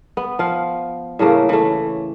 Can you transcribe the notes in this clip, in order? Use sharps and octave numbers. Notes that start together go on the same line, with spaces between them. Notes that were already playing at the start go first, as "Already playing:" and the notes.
B3
F3 F5
A2 C#3 A3 A#3
E3 A3